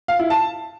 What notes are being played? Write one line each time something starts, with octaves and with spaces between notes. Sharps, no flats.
F5
E4
A5